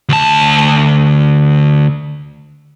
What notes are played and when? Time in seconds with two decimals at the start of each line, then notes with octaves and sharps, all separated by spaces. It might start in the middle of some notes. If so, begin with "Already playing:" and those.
0.09 D2 A5